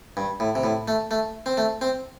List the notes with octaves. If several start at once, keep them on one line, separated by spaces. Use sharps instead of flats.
G2
A2
C3
A2
A3
A3
C4
A3
C4